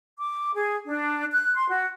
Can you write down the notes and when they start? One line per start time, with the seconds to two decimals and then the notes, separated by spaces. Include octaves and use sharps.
0.17 D6
0.54 G#4
0.86 D4
1.32 F#6
1.55 C6
1.68 F#4